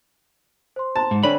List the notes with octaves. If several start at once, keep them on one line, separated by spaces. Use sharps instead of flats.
C5 C6
C5 A5 A#5 C6
G#2
D3 C4 C#4 D5 B5